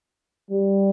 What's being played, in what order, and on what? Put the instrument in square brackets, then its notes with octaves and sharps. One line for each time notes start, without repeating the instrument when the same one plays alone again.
[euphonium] G3